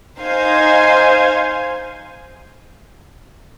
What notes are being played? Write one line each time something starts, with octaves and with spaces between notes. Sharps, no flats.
D#4 C5 F5 G#5